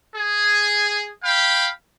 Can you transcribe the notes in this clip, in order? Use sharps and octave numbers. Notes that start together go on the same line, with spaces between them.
G#4
F5 G5 B5